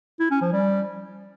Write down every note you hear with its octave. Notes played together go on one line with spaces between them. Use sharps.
E4
C#4
F3
G3